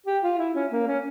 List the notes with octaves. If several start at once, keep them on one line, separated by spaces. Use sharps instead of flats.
G4
F4
E4
C#4
A#3
C#4